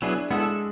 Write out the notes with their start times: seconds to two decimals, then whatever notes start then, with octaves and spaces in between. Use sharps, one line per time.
0.02 F#3 B3 D4 E4 G#4 B4
0.31 G#3 B3 E4 A4